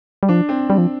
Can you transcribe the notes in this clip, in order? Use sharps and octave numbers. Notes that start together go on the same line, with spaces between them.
G3
F3 D4
C4
G3
F3